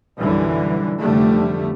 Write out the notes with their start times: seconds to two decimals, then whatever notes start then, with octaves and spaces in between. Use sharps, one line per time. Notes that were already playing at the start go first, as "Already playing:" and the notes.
0.20 B1 F#2 D3 E3 G3
1.01 F1 D3 G3 A3